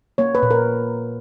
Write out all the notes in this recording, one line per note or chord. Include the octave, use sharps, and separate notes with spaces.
A#3 C#5
B4
A#2
A#4